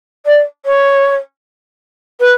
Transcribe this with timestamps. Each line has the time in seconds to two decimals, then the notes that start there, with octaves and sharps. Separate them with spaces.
0.26 D5
0.66 C#5
2.20 B4